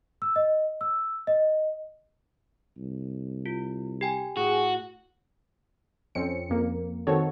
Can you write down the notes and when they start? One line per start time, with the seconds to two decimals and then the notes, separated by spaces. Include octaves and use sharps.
0.22 E6
0.36 D#5
0.81 E6
1.27 D#5
2.77 C2
3.46 F4
4.01 G4 G5 G#5
4.37 A2 F#4 G#4
6.15 F2 C4 C#4 C#7
6.50 F2 A#3
7.07 D#3 C4 F#4 A4 C#5